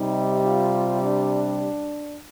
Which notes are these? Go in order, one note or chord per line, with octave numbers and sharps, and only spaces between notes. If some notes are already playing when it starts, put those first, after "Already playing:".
Already playing: C3 G3 D#4
F4
D4